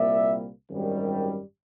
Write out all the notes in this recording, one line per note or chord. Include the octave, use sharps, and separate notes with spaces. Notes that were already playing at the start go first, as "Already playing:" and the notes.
Already playing: C2 A#2 G3 A#3 D5 E5
G#1 F#2 D#3 G3